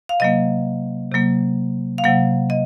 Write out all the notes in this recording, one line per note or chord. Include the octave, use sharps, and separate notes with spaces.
F5
C3 F#3 A#3 D#5
C3 F#3 A#3
F5
C3 F#3 A#3 F#5
D#5